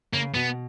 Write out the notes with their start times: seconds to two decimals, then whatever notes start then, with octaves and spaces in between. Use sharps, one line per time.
0.13 C#3 A#3
0.34 B2 B3